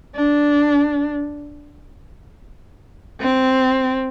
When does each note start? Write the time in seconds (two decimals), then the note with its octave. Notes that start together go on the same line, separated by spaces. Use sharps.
0.16 D4
3.21 C4